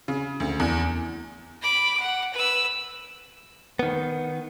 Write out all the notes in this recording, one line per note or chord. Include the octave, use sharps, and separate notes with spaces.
C#3
D2
E2
B5 D6
F#5
B4 E6
D#3 B3